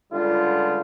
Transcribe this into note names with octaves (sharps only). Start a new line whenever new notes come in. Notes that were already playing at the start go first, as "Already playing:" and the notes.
C#2 D3 G3 F4